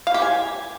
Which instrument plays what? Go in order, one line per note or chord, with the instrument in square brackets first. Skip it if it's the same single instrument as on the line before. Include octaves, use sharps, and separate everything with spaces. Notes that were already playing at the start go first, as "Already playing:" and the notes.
[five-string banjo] F5
G4
G#5